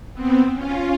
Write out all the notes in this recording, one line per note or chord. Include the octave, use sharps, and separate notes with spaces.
B3 C4
C#4 F4